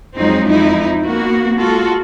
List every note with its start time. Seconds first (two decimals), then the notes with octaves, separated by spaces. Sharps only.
0.16 F2 F3 F#3 G#3 C4 D#4
0.48 F2 D#4 E4
1.03 A#3 B3 F#4
1.58 G#3 F4 F#4 A4